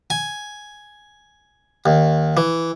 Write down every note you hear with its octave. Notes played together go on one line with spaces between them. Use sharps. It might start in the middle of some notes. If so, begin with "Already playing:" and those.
G#5
D#2
E3